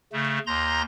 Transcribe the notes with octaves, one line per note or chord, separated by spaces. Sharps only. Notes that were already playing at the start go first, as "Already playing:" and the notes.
C#3 A3
D#2 A#5 C6 G6 A#6